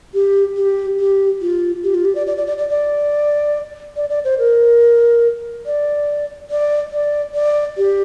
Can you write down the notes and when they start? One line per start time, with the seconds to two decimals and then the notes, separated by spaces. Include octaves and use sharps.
0.14 G4
0.56 G4
1.00 G4
1.42 F4
1.84 G4
1.94 F4
2.05 G4
2.15 D5
2.27 D5
2.37 D5
2.47 D5
2.58 D5
2.69 D5
3.96 D5
4.10 D5
4.25 C5
4.39 A#4
5.66 D5
6.50 D5
6.92 D5
7.34 D5
7.77 G4